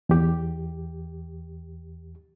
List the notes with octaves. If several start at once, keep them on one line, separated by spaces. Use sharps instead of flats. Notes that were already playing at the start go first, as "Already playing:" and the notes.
E2 G4